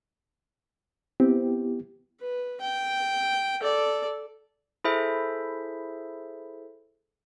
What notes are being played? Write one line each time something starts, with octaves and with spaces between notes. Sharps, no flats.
B3 C4 E4 G4
B4
G5
A4 D5
E4 G#4 A4 C5 E5